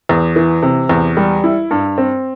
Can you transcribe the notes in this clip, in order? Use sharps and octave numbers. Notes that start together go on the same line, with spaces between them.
E2
E3
C3
E2
G3
E4
G2
C4